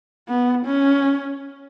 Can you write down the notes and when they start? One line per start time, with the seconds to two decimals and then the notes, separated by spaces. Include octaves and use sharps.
0.28 B3
0.66 C#4